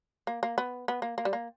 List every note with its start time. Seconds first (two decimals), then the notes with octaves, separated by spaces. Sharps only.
0.27 A#3
0.43 A#3
0.58 B3
0.88 B3
1.02 A#3
1.18 A#3
1.25 G3
1.33 A#3